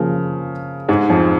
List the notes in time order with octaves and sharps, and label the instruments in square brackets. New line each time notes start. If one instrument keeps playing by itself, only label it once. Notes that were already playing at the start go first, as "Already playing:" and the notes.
Already playing: [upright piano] C#3 [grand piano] F3 A#3 G#4
[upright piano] G#2 G#3
F2 F3